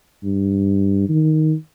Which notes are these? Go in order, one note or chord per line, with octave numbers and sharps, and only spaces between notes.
G2
D#3